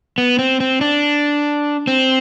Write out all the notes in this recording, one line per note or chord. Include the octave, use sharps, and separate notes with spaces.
B3
C4
C4
D4
C4